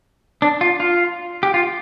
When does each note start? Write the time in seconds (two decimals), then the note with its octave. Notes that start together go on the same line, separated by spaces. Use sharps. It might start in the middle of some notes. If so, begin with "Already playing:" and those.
0.42 D4
0.61 F4
0.80 F4
1.43 G4
1.54 F4